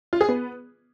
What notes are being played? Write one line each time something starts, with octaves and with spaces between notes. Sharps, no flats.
F4
G#4
B3